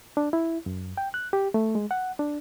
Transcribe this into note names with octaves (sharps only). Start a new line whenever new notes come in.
D4
E4
F#2
G5
F#6
G4
A3
G#3
F#5
D4